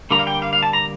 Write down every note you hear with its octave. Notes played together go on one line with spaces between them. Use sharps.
D3 G3 A#3 A#5
F5
G5
F5
F5
A5
A#5